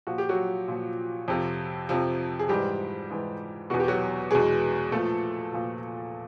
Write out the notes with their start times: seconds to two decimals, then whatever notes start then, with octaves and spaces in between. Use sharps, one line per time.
0.07 A#2 F3 F#4
0.18 G4
0.29 F#3 F#4
0.68 A#2 F3
1.28 F2 C3 F3
1.89 F2 C3 F3
2.39 G#4
2.49 G#2 E3 G3 G4
3.10 G#2 E3
3.70 E2 B2 F#4
3.80 G4
3.88 F#3 F#4
4.31 E2 B2 G#3 G#4
4.91 A#2 F3 A3 A4
5.53 A#2 F3